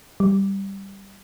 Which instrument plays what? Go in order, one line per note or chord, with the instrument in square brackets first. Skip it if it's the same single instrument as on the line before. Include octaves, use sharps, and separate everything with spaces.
[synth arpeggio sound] G3